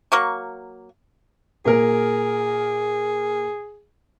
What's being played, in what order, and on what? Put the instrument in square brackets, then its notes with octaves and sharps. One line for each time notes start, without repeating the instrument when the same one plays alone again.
[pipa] F#3 A#3 C#6
[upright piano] A#2 A#3 A#4 [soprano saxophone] G#4